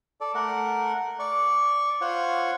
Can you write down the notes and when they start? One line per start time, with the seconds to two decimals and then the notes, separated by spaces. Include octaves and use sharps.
0.21 A4 D5
0.35 A3 A#4 F#5
1.19 D5 C#6
2.01 F4 C5 C#5 F#5 C#6